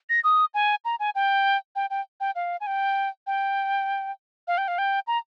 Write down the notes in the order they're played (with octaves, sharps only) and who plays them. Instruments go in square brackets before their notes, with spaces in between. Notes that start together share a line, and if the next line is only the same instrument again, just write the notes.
[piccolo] A#6
D#6
G#5
A#5
G#5
G5
G5
G5
G5
F5
G#5
G5
G5
F5
G5
F5
G5
A#5